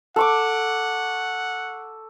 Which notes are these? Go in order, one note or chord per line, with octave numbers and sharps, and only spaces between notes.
A4 F#5 C#6 D6